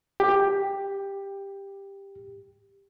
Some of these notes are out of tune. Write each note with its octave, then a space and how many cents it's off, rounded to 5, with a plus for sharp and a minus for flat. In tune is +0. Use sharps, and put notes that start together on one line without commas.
G4 +10